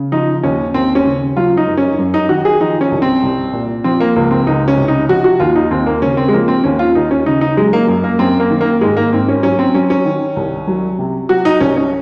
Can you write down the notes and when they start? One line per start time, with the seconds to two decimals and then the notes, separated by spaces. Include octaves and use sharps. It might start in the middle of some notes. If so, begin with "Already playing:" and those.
Already playing: C#3
0.12 F3 D#4
0.43 D#2 C#4
0.74 D#2 C4
0.95 C#4
1.05 C#3
1.36 F#3 F4
1.57 D#4
1.68 F#2
1.77 C#4
1.98 F#2
2.14 D#4
2.29 D#3 F#4
2.45 G#4
2.60 F3 D#4
2.81 C#4
2.91 C2
3.02 C4
3.23 C2
3.53 A#2
3.84 F3 C4
4.00 A#3
4.16 C#2 A#3
4.31 C4
4.47 C#2 D#4
4.68 C#4
4.77 C3
4.88 D#4
5.09 F3 F#4
5.24 F#4
5.40 D#2 F4
5.56 D#4
5.71 D#2 C4
5.86 A#3
6.02 C#3 C#4
6.17 C4
6.28 G#3
6.33 F3 A#3
6.48 C4
6.64 D#2 C#4
6.79 F4
6.95 D#2 D#4
7.11 C#4
7.26 C#3 D#4
7.41 D#4
7.57 F#3 G#3
7.73 A#3
7.88 F#2
8.04 A#3
8.19 F#2 C4
8.40 A#3
8.50 D#3
8.61 A#3
8.81 G#2 G#3
8.97 A#3
9.12 G#2 C4
9.28 C#4
9.43 F#3 C#4
9.59 C4
9.74 F#3 C#4
9.90 C#4
10.05 D#3
10.36 C2
10.67 F#3
10.99 C3
11.29 F#3 F#4
11.45 D#4
11.60 C2 C#4
11.76 C#4